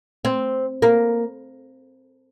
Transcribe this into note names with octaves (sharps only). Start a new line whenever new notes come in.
C4
A#3